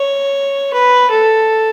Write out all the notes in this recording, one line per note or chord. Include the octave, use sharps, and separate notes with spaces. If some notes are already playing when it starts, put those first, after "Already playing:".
Already playing: C#5
B4
A4